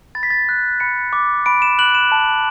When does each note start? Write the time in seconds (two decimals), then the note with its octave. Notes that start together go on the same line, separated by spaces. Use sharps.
0.15 B5 A6
0.23 B6
0.30 A6
0.49 F#6
0.80 B5 C#7
1.13 D6
1.46 B5 D7
1.62 E7
1.79 F#6 F#7
1.95 E7
2.12 A5